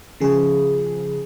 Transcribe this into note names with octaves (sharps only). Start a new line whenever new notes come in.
C#3 F3 G#4